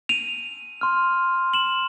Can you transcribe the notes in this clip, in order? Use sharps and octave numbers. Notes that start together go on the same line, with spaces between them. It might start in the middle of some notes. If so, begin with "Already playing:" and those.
D#7 F7
C6 F6
E7 F#7